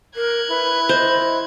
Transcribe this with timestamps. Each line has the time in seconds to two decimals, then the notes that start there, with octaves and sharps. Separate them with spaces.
0.16 A#4 F#6 G#6
0.49 E4 B4
0.89 C5 D#5